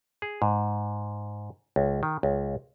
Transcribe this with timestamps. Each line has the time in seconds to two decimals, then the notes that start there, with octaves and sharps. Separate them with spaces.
0.22 G#4
0.42 G#2
1.76 C#2
2.03 D#3
2.23 C#2